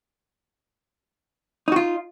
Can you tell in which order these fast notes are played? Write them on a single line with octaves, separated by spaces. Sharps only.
D#4 F#4 F4